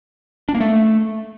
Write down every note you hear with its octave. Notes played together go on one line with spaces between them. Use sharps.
D4
A#3
A3